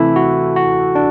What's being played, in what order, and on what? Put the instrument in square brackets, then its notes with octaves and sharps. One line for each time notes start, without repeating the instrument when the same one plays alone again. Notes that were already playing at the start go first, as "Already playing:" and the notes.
Already playing: [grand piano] C3 E3 A3 [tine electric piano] E4
[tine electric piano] F#4
F#4
D4